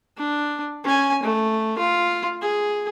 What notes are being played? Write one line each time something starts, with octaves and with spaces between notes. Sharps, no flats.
D4
C#4 G#5
A3
F4
G#4